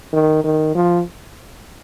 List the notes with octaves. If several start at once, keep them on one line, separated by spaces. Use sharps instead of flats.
D#3
D#3
F3